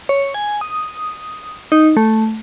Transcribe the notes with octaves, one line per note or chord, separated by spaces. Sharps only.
C#5
G#5
D#6
D#4
A3